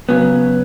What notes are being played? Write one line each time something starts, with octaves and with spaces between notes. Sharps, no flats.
C#3 F#3 B3